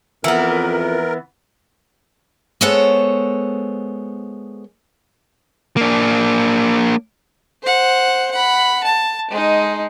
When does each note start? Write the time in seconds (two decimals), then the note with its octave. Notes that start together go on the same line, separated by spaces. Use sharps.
0.24 F2 E3 B3 A#4
2.61 G#3 B3 A4 C5 C#5
5.77 A#3 D4
7.63 C5 F#5
8.31 F#5 B5
8.84 A5
9.31 G#3 D#4